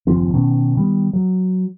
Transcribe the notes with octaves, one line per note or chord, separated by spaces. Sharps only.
F#1 D#2 F3 C4
B2 D#3 B3 C#4
D#3 G3 B3
F#3